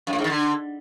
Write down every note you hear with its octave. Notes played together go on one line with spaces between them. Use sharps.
F#2
A2
G#2
D#3
D3